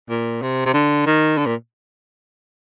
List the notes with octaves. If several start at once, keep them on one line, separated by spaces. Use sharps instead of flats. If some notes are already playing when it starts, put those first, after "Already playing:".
A#2
C3
C3
D3
D#3
D3
A#2